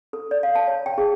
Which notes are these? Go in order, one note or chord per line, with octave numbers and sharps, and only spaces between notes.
A4
D5
F5
A5
C#5
G5
G#4